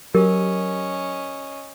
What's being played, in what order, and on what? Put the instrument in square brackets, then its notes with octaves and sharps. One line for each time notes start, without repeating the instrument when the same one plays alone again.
[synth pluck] F#3 [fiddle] C#4 D#5 [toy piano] G4 A#4